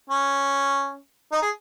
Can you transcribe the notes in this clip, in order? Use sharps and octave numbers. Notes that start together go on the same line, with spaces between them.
C#4
D#4
G#4